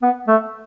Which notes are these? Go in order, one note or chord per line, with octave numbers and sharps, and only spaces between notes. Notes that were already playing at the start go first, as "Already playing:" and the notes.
B3
A3